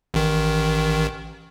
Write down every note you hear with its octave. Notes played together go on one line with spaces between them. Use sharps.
A1 D#3